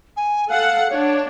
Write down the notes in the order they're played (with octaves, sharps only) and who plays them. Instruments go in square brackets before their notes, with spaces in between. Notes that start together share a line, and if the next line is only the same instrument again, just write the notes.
[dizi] G#5
[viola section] A4 F#5 [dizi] F5
[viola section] D4 [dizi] C#5